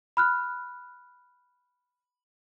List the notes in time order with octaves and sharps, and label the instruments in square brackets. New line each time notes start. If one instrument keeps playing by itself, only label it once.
[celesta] B5 F6 F#6